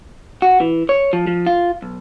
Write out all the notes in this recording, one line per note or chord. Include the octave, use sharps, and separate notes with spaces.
F#4
E3
C#5
F3
F3
F4
B1